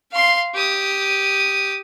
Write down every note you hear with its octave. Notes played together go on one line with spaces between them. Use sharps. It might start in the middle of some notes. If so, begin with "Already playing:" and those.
F5 C6
G4 D#6